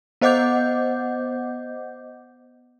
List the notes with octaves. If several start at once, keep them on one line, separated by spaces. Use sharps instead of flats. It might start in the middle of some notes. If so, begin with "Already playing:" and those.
B3 C5 D#5 F#5 D6 G6